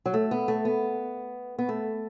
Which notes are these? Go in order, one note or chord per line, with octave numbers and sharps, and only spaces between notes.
F#3
A3
B3
A3
B3
B3
A3